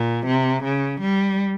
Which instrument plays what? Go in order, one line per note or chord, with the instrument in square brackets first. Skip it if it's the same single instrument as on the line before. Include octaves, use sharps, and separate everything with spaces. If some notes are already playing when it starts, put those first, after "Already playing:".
Already playing: [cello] A#2
C3
C#3
G3